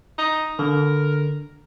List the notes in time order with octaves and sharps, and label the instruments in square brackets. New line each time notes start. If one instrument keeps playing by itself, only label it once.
[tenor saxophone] D#4
[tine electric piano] D3 [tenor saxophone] A#4